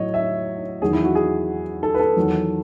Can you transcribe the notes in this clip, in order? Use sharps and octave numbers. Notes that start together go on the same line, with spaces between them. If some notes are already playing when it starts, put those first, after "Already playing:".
Already playing: A2 F#3 C#5 D#5
E5
E2 D#3 F#3 G#4
E4
F#4
G#4
A4
B4
A4
E2 D#3 F#3